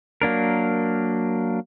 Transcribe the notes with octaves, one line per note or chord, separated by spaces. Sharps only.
F#3 A#3 D4 A#4